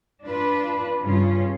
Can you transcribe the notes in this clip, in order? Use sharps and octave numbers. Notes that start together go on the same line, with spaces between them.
D4 F4 B4
G2 C#3 C#4 F4